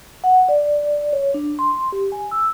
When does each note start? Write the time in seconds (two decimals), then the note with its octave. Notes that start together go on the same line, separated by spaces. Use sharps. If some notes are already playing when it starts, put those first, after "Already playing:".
0.24 F#5
0.49 D5
1.13 C#5
1.34 D4
1.59 C6
1.92 G4
2.12 G#5
2.31 E6